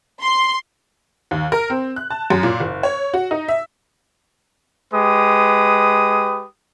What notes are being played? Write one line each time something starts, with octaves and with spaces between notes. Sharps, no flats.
C6
D#2
A#4
C4
F#6
A5
F#2
A#2
F#1
C#5
F#4
D#4
E5
G#3 G4 B4 D#6